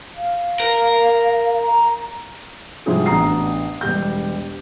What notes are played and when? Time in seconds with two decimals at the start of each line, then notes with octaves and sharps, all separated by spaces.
0.17 F5
0.60 A#4
1.62 A#5
2.86 G#2 C3 F3 G3 F#4 G#4
3.06 A1 B3 D4 A#5 D#6 C7
3.81 E1 G3 G6